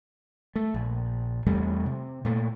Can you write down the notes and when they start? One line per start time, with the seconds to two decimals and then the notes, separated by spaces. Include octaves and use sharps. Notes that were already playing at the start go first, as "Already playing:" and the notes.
0.56 A3
0.74 A#1
1.46 E2 C3 G3 A3
1.86 C3
2.25 A#2 A3